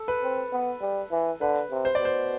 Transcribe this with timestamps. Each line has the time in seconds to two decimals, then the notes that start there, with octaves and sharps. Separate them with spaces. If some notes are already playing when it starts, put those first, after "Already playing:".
Already playing: A4
0.08 B4
0.23 C4
0.52 B3
0.81 G3
1.11 E3
1.41 D3 B4
1.71 C3
1.85 C5
1.95 D5
2.00 B2
2.05 C5